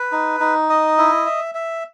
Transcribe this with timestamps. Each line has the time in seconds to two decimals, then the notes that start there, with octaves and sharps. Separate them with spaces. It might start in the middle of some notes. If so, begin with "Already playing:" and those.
Already playing: B4
0.12 D#4
0.40 D#4
0.70 D#5
0.98 E4
1.26 E5
1.55 E5